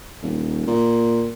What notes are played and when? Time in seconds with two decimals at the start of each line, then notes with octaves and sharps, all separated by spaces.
0.23 D#1
0.67 A#2